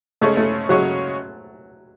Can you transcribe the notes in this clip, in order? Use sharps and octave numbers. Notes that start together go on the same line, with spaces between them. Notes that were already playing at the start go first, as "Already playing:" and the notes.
C#3 G#3 A3 C#4 G#4 C#5
A3
C#3 F#3 G#3 C#4 G#4 C#5